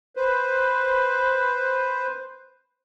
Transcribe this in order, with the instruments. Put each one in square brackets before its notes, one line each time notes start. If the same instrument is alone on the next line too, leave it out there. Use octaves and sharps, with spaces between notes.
[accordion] B4 C5